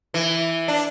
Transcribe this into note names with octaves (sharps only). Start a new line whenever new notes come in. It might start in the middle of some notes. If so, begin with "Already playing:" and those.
E3
D4